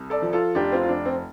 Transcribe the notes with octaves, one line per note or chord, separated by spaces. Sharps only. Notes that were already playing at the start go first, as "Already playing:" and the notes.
Already playing: C2
A4 D5
F3
F4 A4
F1 D4 G4
C4 F4
F4
F1 D4
C4